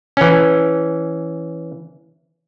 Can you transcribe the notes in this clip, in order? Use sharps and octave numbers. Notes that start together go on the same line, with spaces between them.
E3 C#4